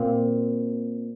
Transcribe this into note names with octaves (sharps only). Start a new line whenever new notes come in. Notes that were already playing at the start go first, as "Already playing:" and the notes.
Already playing: A#2 C4